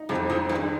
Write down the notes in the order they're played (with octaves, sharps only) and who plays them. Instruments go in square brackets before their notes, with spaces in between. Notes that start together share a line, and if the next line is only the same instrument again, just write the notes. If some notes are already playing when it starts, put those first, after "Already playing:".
Already playing: [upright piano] D#4
[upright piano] F2 [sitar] C3
[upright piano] F2 [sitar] G#2
[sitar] G2 [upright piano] D#3